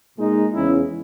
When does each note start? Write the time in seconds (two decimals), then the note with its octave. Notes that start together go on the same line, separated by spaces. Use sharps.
0.16 A#2 G#3 D#4
0.53 E2 C#3 G#3 C#4 E4